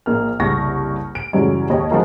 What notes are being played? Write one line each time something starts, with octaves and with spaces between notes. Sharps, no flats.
A#1 A#3 F6
F#1 C2 C#6 A#6
D7
F#2 C#3 E3 F#3 G3 C#4
D#2 G4 C#5 D#5
F3 D#4 F4 F#4 G#4 A#4